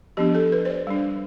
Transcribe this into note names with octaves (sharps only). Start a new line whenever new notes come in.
F3 B3 D4 G4
A4
B4
C5
D5
G3 D4